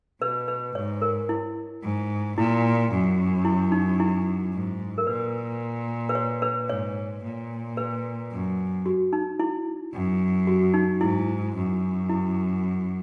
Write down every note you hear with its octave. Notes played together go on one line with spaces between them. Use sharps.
B2 B4
B4
G#2 C#5
A#4
E4
G#2
A#2 E4
F#2
E4
D#4
E4
G#2
A#4
A#2 B4
B4
C#5
B4
G#2 C#5
A#2
B4
F#2
F#4
D#4
E4
F#2
F#4
D#4
G#2 E4
F#2
E4